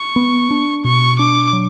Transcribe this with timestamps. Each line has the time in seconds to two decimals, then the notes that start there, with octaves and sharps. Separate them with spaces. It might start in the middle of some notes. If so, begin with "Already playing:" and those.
Already playing: C#6
0.16 B3
0.51 D4
0.84 B2 C#6
1.19 D4 D6
1.53 F#3